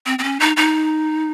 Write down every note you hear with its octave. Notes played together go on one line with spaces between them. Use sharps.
C4
C4
C#4
D#4
D#4